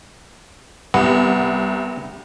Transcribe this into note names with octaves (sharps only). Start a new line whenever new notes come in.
C2 B3